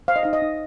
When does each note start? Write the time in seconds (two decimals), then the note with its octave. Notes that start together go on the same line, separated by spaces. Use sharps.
0.08 C5 F5
0.16 D#5
0.23 D#4 F5
0.33 D#5
0.42 D#4